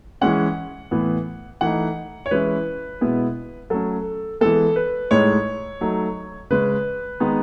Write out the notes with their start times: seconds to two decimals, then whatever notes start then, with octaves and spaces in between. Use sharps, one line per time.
0.21 E3 G#3 C#4 F#5
0.91 A2 E3 B3
1.61 E3 A3 D#4 F#5
2.26 C#5
2.31 E3 G#3 C#4 E4 B4
3.01 B2 G#3 B3 E4
3.70 F#3 A3 C#4 A4
4.41 E3 G#3 B3 A4
4.76 B4
5.11 A2 G#3 D#4 C#5
5.81 F#3 A3 D#4
6.50 C#3 G#3 C#4 B4
7.20 D#3 G#3 B3 D#4